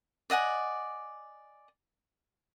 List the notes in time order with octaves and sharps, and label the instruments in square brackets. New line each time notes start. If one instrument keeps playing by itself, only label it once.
[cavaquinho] D5 D#5 F#5 G#5